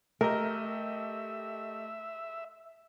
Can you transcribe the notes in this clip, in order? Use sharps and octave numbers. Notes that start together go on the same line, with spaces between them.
A3 G4 A#4 D#5 E5